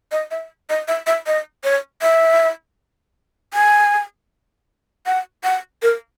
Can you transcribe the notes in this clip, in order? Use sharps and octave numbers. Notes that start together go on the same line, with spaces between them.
D#5
E5
D#5
E5
E5
D#5
C#5
E5
G#5
F#5
F#5
A#4